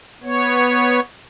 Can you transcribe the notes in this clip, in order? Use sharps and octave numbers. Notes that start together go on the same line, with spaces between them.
B3 C#5